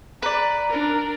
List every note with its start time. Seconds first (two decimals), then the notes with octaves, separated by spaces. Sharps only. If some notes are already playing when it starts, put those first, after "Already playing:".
0.22 B4 D5 A#5
0.70 D4 A#4